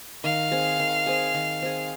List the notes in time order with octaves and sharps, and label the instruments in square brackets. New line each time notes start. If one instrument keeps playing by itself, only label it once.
[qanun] D#3 [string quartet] F5
[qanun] C4 G#4
D#3
C4 G#4
D#3
C4 G#4